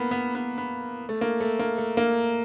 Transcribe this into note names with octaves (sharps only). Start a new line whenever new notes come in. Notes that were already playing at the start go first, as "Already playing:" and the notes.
Already playing: A#3 B3
B3
B3
B3
A3
A#3
A3
A#3
A3
A#3